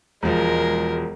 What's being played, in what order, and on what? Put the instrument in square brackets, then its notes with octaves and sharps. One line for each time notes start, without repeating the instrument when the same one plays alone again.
[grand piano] E1 F3 [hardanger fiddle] G#3 A#4